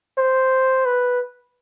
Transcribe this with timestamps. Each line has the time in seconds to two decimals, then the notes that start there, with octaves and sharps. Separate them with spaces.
0.18 C5
0.86 B4